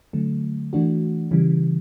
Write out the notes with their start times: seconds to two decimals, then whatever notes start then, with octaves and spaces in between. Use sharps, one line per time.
0.13 D3 F#3 A3
0.73 E3 A3 D4 F#4
1.31 C#3 E3 G3